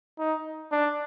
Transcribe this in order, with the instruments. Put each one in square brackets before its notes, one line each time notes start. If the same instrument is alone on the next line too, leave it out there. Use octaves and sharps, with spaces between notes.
[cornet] D#4
D4